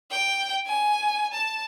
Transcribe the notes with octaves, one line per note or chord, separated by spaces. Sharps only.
G5
G#5
A5